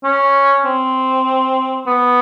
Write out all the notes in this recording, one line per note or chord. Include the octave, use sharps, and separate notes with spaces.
C#4
C4
B3